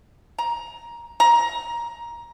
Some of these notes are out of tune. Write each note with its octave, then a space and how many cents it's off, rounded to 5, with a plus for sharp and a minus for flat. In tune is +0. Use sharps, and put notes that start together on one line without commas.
A#5 +15
A#5 +15